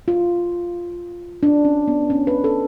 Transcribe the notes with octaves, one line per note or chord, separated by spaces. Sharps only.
F4
D4
C#4
B3
C#4
B4
A4